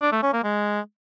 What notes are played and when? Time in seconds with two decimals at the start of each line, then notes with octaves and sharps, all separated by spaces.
0.02 D4
0.12 A3
0.23 C#4
0.33 A#3
0.44 G#3